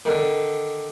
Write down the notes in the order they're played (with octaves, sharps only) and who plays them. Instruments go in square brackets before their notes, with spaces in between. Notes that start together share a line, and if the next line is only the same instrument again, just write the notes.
[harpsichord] D3 D#3